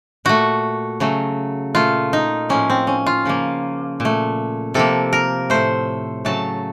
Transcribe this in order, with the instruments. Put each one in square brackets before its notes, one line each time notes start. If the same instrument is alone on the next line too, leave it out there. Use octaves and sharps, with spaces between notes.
[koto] A#2 A3 F#4
C#3 F#3 A3
A#2 A3 F4
D#4
A2 F3 A#3 C#4
C4
C#4
F4
C#3 F3 A#3
A#2
A3
C3 F3 A#3 A4
A#4
A2 A3 C5
C#3 F#3 A3 A5